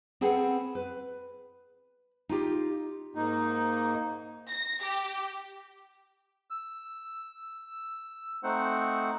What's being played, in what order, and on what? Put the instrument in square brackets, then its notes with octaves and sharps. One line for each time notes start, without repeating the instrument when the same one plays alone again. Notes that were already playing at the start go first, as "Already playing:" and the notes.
[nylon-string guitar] C4 G#4 A4 B4 F#5 G5
B4
D#4 F4 G4
[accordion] G#2 A#3 D#4
[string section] A#6
G4
[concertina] E6
A3 C4 D#4 C5 F#5